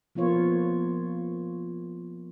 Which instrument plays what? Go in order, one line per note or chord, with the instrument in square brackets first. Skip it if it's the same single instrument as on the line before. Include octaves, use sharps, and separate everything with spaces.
[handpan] F3 A#3 B3 F4 C#5